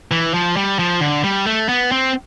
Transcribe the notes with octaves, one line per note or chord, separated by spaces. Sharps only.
E3
F3
G3
F3
D3
G3
A3
B3
C4